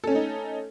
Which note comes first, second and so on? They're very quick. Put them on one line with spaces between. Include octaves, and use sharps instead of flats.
A4 C#4 A3 D#4